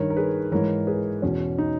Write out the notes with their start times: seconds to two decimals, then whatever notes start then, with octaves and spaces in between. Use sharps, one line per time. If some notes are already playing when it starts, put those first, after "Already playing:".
Already playing: G2 D#3 A#4 C#5
0.10 A#4
0.17 G#4 B4
0.52 G#2 E3 A#4 C#5
0.87 G#4 B4
1.22 E2 B2 C#4
1.58 D#4